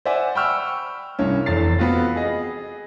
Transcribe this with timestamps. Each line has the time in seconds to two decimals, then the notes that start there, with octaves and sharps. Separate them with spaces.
0.05 C5 D5 E5 F#5 G#5
0.35 G5 B5 C#6 E6 F6
1.19 C2 G2 C#4
1.46 F1 E2 A6 C7
1.78 B3 C4 F4 F#4
2.16 G#4 D#5